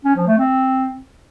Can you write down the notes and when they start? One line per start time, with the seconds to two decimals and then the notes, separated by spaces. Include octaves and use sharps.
0.05 C#4
0.16 F3
0.27 A3
0.38 C4